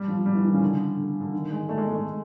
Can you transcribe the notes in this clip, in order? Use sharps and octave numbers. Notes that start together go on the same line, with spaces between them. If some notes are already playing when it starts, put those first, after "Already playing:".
Already playing: G3
F3
G3
E3
D#3
C#3
D3
D3
D3
D#3
G#3
A3
G#3
A3
G#3